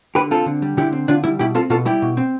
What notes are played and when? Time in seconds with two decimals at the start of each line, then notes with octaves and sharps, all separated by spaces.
0.15 D3 G4 B4
0.31 C4 F4 A4
0.46 D3
0.62 G3
0.77 D3 E4 G4
0.93 C4
1.08 D3 D4 F4
1.24 G3 E4
1.39 B2 E4 G4
1.55 C4 F4 A4
1.70 B2 F4 A4
1.85 G3 E4 G4
2.02 B2
2.17 C4